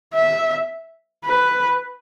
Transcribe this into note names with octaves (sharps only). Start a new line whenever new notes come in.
E5
B4